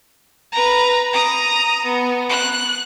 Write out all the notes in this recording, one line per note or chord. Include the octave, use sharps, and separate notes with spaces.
B4 A#5
A#5 D#6
B3
F#6